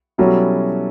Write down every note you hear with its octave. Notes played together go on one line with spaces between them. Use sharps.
B2 F#3 G3 C#4 E4 A4